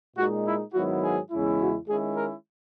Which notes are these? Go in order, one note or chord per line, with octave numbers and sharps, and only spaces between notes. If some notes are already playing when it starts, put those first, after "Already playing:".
A#2 G#3 D#4 F#4
E4
G#2 D#3 F#3 B3 E4 F#4
G#4
E2 C#3 G#3 C#4 E4
F#4
D#3 G#3 C#4 E4 G#4
A#4